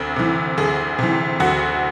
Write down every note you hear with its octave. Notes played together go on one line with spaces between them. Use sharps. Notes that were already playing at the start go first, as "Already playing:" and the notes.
Already playing: D2 C3
C3 E3
D2 G#4
C3 E3
D2 F#4